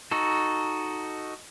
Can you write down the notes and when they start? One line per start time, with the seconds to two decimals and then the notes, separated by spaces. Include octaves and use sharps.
0.11 D#4 F#4 A4